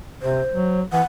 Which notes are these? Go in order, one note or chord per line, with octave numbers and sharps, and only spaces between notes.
C3 C5
F#3
E3 F#5